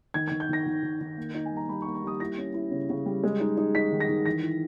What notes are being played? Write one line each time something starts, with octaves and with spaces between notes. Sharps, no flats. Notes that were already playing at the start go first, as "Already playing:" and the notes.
D#3 G#6
D#3 G#6
G6
D#3 A#6
D#3
D#3
D#3
A#3
D#4
G#5
G3 A#5
G3 B5
C#6
A#3
C#6
G3 D#6
E4 A#6
C#4
E4
C#3
C#3
G3
G#3
D#4
D#4
D#4 B6
D#3
A#6
D#3
E3 A#6
E4